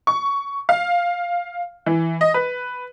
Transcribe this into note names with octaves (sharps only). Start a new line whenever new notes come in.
C#6
F5
E3
D#5
B4